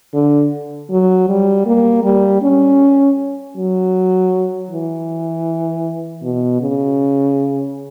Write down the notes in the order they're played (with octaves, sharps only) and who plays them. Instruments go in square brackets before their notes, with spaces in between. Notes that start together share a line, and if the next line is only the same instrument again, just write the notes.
[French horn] D3
F#3
G3
A#3
G3
C#4
F#3
E3
B2
C#3